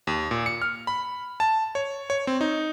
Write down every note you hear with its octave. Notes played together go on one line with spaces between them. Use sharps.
D#2
A#2
C#7
F6
B5
A5
C#5
C#5
C4
D#4